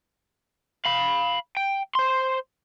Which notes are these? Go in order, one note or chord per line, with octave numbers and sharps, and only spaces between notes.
F5 B5
G5
C5 C6